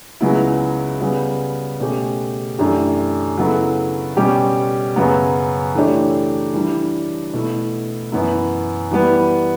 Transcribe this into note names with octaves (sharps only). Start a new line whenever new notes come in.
C#2 C#3 F#3 B3 E4
C#3 G3 B3
B2 A3 C#4 G4
F#2 E3 A3 D4 G4
C#3 F#3 B3 E4 A4
B2 G3 C#4 G4
F#2 C#3 F#3 B3
E3 A3 D4 G4 C#5
E3 G3 D4
B2 A3 E4
F#2 E3 B3 E4
E3 G3 B3